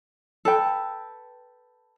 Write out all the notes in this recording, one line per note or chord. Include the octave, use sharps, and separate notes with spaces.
A4 B4 G5